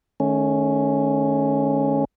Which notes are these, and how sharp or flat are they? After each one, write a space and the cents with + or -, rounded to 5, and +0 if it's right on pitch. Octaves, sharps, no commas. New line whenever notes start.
D#3 -30 A3 -35 C#4 +0